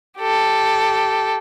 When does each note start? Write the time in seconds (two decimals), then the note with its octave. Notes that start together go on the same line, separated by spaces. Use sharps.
0.19 G4 A4